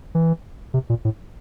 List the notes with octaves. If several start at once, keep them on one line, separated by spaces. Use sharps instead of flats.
E3
C3
A#2
A2